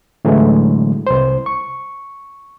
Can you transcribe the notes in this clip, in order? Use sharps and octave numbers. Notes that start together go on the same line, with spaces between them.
A2 D3 E3 F#3 G#3 A3
C2 C5
C#6